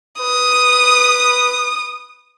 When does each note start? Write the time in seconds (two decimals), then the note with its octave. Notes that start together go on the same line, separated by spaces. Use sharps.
0.21 B4 D#6